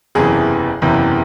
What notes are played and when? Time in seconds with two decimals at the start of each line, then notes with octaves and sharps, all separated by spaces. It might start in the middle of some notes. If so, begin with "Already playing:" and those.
0.15 F#1 E2 C3 E3 G#4
0.82 F#1 E2 C3 E3